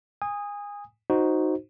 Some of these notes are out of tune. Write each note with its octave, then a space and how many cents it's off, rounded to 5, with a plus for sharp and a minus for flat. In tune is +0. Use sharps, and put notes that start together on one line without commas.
G#5 -25 D#6 +0
D#4 +0 F#4 +0 C5 +0